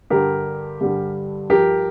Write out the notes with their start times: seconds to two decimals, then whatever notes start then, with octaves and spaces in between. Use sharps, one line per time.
0.10 G2 D3 G3 G4 A#4
0.81 G2 D3 G3
1.50 G2 F3 G4 A#4